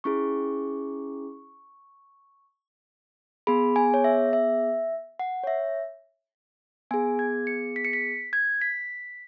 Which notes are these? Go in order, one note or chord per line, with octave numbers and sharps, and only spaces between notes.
C#4 E4 G#4 C#6
B3 G#4 B5
G#5
C#5
E5
E5
F#5
C#5
E5
B3 G#4 G#5
G#6
C#7
B6
C#7
B6
G#6
B6